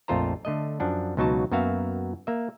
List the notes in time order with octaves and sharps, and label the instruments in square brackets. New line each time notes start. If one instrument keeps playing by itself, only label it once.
[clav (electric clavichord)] A#1 F2 A3 F4 C5 A#5
D3 A3 D#5
F#2 F3 D4 F#5
C#2 B2 F#3 D#4 F#4 A5
F#2 A#3 B3 F#4 E5 F5
A#3 E5